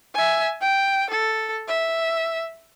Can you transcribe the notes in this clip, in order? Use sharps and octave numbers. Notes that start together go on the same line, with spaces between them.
E5 G#5
G5
A4
E5